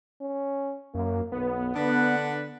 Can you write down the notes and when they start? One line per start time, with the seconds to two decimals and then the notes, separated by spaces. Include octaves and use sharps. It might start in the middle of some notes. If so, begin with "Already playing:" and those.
0.21 C#4
0.94 F#2 A#3
1.32 B1 B3
1.76 D3 D4 B4 F#5